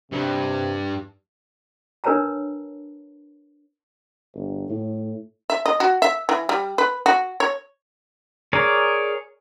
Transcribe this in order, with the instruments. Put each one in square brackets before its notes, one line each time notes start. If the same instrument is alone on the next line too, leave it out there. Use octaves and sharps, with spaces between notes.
[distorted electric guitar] G2 [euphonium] C3
[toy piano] D4 A#4 B4 C#5 A5 A#5
[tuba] G1
A2
[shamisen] E5
D#5
F#4
E5
E3
G3
B4
F#4
C#5
[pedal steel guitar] G#4 A#4 C#5 D5